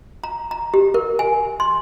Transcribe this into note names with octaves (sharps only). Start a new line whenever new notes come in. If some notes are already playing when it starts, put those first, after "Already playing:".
A#5
A#5
G4
A#4
G#5
C6